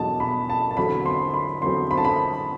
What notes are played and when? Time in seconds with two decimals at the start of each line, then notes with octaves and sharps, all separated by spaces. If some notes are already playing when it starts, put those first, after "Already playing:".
Already playing: E2 B2 F#3 A5
0.20 B5
0.50 A5
0.70 A5
0.77 E2 D3 F#3 C4 B5
1.06 C6
1.34 B5
1.62 E2 D3 F#3 C4 C6
1.91 B5
1.97 A5
2.05 B5